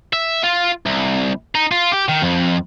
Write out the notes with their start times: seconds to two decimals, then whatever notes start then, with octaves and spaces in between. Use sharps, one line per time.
0.13 E5
0.43 F4
0.86 C2
1.55 D#4
1.71 F4
1.92 G4
2.09 D#3
2.22 F2